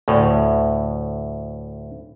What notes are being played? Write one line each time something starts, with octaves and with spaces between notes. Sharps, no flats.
D2 A2